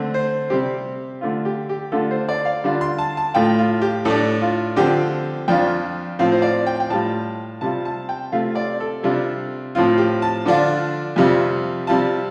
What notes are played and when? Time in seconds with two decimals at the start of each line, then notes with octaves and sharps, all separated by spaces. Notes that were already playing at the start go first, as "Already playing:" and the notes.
Already playing: D3 A3 C4
0.14 C5
0.50 C3 G3 C4 G4
1.21 D3 A3 F4
1.45 G4
1.69 G4
1.92 D3 A3 F4 A4
2.11 C5
2.29 D5
2.45 F5
2.64 D3 G3 D4 F4
2.81 C6
2.98 A5
3.17 A5
3.34 A2 A3 F4 G5
3.59 F4
3.81 G4
4.05 A2 A3 D4 A4
4.42 F4
4.76 D3 F3 C4 G4
5.48 F2 F3 D4 F4 G5
6.19 A2 F3 C4 F4 F5
6.32 C5
6.42 D5
6.66 G5
6.80 G5
6.90 A2 G3 F4 A5
7.61 C3 G3 F4 A5
7.85 A5
8.09 G5
8.32 C3 A3 F4 F5
8.55 D5
8.80 A4
9.03 C3 G3 D4 F4
9.75 A2 F3 C4 F4
9.98 G4
10.22 A5
10.45 D3 F3 D4 F4
11.16 F2 C3 G3 F4
11.87 C3 G3 F4 A5